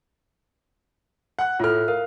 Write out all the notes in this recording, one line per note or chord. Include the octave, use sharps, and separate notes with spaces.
F#5 F#6
A2 F4 A4 F6
A#4 F5